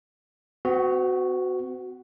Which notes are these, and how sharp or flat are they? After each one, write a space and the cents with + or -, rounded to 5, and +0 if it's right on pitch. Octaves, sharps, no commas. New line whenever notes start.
C4 -45 F#4 +0